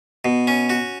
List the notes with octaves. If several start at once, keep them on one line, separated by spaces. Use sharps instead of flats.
B2
C#4
F#4